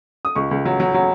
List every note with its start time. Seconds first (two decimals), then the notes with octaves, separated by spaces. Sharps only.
0.25 D#6
0.35 C#2 C#6
0.51 C#2
0.65 F#3
0.80 F#3
0.94 F#3